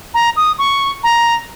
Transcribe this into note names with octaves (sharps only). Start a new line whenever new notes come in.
A#5
D#6
C#6
A#5